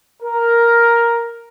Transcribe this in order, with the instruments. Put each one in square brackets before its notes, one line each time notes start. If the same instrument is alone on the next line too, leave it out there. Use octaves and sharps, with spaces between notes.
[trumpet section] A#4